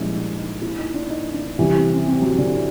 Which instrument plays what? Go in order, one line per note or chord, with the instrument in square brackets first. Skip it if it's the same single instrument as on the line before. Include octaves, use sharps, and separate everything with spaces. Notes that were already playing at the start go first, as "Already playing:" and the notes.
Already playing: [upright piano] A#2 F3 A#3 C#4 E4 [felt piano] G3 G#3
[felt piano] D4
D#4
E4
D#4
D4
D#4
D4
[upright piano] C3 E3 G3 [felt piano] C#4
[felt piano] C4
C#4
C4
F#3
D3